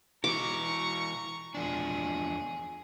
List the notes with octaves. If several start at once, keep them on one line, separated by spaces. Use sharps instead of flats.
E3 E4 F#4 A#5 C#6 D6
E2 F3 D4 G#4